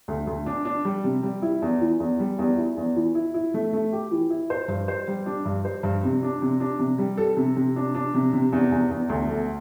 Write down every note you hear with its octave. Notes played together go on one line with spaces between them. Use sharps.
D2
D2
D4
D4
G3
C3
G3
E4
E2
E3
E2
G3
E2
E4
E2
E3
E4
E4
A3
A3
G4
E3
E4
C5
G2
C5
G3
D4
G2
C5
G2
C3
D4
C3
D4
C3
G3
A4
C3
C3
D4
D4
C3
C3
E2
E2
E2
D2
A3